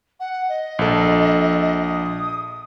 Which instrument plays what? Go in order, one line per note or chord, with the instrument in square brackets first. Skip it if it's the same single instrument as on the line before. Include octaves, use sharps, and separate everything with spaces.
[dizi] F#5
D#5
[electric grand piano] A#1 A4
[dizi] D#6